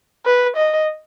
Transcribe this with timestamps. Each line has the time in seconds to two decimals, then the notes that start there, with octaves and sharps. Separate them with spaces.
0.25 B4
0.57 D#5